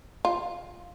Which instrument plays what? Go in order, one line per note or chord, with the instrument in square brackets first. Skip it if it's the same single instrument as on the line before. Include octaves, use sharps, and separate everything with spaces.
[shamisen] F4